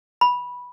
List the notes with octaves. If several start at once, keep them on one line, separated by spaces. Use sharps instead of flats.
B5